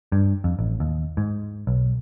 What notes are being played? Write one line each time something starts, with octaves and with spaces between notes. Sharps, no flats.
G2
F2
A1
D#2
G#2
B1